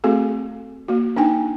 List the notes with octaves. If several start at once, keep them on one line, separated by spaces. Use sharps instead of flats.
A3 C4 F#4 G#4 A4
A#3 F#4
D4 D#4 G5 G#5